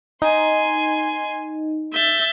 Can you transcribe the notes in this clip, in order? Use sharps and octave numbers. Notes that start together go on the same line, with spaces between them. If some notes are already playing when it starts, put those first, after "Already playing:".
D#4 G#5 C6
E5 G6 A6